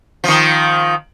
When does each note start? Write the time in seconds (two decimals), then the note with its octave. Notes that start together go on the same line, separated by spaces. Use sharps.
0.24 D#3 F3